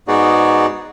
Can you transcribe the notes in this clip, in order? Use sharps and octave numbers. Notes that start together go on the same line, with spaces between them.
G#2 B3 D#4 F#4 G#4 D5